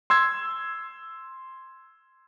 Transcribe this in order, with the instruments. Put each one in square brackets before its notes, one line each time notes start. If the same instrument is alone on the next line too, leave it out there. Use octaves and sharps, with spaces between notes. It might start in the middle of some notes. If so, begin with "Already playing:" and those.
[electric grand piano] C6 E6 G#6